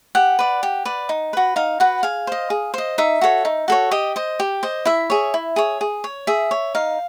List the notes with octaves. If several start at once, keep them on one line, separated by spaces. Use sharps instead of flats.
G4 F#5
B4 D5
G4
B4 D5
D#4
F#4 B4
D#4 F5
F#4 B4 F#5
G#4 F5
C5 D#5
G#4
C5 D#5
D#4 E5
F#4 A4 C#5
D#4
F#4 A4 C#5
G4 D#5
C5 D#5
G4
C5 D#5
E4 E5
G#4 C#5
E4
G#4 C#5
G#4
C#5
G#4 E5
C#5
D#4 F5